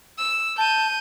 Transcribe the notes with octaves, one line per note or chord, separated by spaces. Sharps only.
E6
A5 G6 D#7